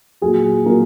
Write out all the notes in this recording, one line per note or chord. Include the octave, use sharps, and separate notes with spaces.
A#2 F#3 G#4
A#2 F#3 A#4